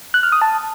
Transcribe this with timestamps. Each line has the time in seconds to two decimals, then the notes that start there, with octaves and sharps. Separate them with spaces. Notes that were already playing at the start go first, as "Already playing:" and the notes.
0.14 F#6
0.23 F6
0.32 D#6
0.42 A5